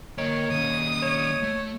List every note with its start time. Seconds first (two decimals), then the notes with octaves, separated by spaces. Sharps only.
0.18 A#3 A#4 C#5 D#5 G5
0.51 D#3 C#4 D#6
1.03 C#5
1.42 A3